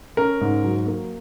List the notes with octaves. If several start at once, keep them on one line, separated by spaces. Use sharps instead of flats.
C#4 A#4
G#2
F#3
A#3